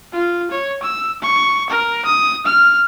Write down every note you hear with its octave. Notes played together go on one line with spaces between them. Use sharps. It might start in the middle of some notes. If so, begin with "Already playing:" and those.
F4
C#5
E6
C#6
A#4
D#6
F6